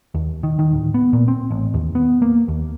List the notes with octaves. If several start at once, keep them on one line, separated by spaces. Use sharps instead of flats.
D#2
D#3
D#3
D1
B3
A#2
C4
A1
D#2
B3
A#3
D#2